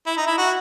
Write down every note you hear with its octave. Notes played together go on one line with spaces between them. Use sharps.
E4
D#4
E4
F#4